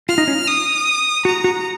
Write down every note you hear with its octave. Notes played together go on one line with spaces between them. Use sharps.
F4 F6
D#4
C#4
D#6
F#4 A#5
F#4